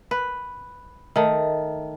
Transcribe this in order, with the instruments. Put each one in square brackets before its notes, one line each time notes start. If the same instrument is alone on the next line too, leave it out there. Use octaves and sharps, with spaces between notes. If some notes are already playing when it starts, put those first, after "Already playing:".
[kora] B4
D#3 A3